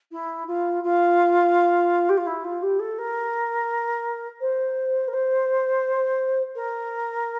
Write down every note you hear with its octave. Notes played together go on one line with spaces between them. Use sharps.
E4
F4
F4
G4
F4
E4
F4
G4
A4
A#4
C5
A#4
C5
A#4